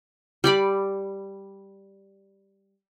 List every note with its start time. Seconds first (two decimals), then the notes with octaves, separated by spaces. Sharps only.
0.44 G3 D5 B5